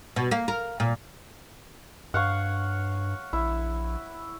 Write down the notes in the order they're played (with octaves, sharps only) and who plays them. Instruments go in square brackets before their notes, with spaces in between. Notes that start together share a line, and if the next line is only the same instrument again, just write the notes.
[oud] B2
A#3
A#4
A#2
[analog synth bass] G2 [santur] C#5 F5 F#5
[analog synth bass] A#1 [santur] E4